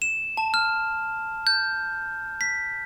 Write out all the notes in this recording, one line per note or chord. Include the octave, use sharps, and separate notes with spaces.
E7
A5
F6
G6
B6